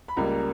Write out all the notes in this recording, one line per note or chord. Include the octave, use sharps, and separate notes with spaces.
B5
C#2 C#3 G3 A#3 A#5